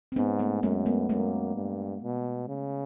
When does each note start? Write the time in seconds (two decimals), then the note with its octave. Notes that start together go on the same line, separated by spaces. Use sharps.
0.12 C4
0.16 G#2 B3 C#4
0.39 A3 B3
0.63 F#2 G#3 A#3
0.86 A3 B3
1.09 F#2 G#3 A#3
1.55 G2
2.02 B2
2.48 C#3